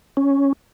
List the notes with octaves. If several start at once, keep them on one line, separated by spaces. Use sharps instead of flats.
C#4